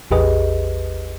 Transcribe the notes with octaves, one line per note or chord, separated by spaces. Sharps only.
A1 E2 G4 G#4 B4 D#5